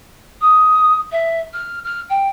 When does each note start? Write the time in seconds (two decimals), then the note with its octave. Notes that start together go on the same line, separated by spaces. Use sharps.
0.41 D#6
1.12 E5
1.53 F6
1.84 F6
2.10 G5